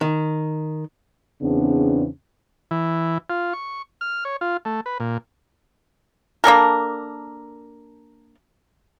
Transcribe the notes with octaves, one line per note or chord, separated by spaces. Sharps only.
D#3
E2 C#3 B3 C4 D4
E3
F4
C#6
F6
C#5
F4
A3
B4
A#2
A#3 D4 A4 A#4